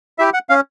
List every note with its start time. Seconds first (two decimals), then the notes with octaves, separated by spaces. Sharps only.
0.19 E4 G4 E5
0.34 F#5
0.49 C#4 F5